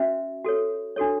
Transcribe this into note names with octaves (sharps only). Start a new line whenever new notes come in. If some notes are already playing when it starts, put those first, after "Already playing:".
Already playing: C#4 F#4 B4 E5
F#4 A4 C#5
D4 F#4 A4 C#5